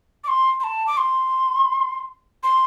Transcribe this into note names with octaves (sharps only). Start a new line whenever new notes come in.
D6
C6
C6
A5
D6
C6
C6